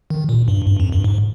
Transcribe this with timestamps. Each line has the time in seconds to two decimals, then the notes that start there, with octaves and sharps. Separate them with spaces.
0.10 D#3
0.29 A#2
0.48 G2
0.67 G2
0.80 F2
0.92 G2
1.04 G#2